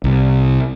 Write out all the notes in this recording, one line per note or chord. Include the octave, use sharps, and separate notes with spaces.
C2